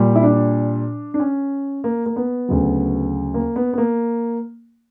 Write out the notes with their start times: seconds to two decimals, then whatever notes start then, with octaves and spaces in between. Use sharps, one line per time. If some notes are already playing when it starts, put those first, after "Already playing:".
Already playing: A#2 G3
0.15 E4
0.23 D4
1.14 D4
1.20 C#4
1.84 A#3
2.06 A#3
2.16 B3
2.49 D2 C#3 F#3
3.34 A#3
3.56 B3
3.73 B3
3.78 A#3